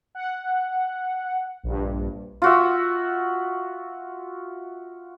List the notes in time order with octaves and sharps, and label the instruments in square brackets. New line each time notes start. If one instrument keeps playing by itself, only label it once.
[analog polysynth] F#5
A#1 G2
[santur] F4 F#4 E5